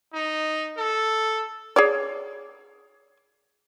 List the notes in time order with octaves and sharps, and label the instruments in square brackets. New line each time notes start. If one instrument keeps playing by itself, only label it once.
[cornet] D#4
A4
[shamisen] G#4 C#5 D5